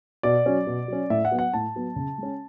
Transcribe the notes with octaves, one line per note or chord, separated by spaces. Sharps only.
B2 D5
F#3 C#4
B2
F#3 C#4
A2 E5
F#5
F#3 B3
F#5
A2 A5
F#3 B3
C#3
G#3 C#4